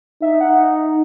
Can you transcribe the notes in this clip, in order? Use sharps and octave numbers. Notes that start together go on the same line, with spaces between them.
D#4 E5
F#5